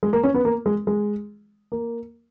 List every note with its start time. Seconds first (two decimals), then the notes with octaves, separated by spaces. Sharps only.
0.03 G#3
0.13 A#3
0.24 C#4
0.34 B3
0.45 A#3
0.66 G#3
0.87 G#3
1.72 A#3